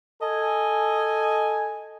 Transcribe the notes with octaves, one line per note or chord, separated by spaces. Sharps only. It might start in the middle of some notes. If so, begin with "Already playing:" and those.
A4 D#5 G#5